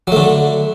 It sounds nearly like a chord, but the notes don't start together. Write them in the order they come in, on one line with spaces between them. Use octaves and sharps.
F#3 A3 D3